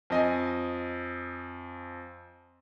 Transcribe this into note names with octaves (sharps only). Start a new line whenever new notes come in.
F2 D#5 G#5